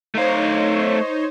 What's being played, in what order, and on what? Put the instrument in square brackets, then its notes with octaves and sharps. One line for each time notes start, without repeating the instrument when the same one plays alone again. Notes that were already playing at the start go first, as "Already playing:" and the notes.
[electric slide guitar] A3 F5 [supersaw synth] D#4 C5 C#5